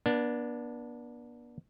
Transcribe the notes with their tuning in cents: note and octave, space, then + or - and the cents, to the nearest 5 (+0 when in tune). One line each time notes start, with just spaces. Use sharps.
B3 -40 D4 +0